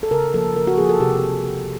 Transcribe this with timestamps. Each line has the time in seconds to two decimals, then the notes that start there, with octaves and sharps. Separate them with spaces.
0.03 A4
0.11 C#3 A#4
0.34 F3 A#3 A4
0.56 C#3 A#4
0.67 F#4
0.78 F3 A#3 G#4
0.89 A4
1.00 C3 G4